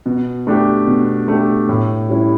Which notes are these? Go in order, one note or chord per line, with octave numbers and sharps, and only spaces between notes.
B2
A3 D4 G4
B2
A3 D4 G4
A2
G3 C#4 E4